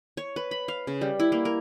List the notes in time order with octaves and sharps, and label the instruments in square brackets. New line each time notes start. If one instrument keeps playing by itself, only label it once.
[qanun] C#5
B4
B5
F5
C#3
G3
E4
A#3
A#4